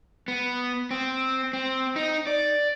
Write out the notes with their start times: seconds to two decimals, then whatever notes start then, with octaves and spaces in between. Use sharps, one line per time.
0.28 B3
0.91 C4
1.53 C4
1.96 D#4
2.27 D5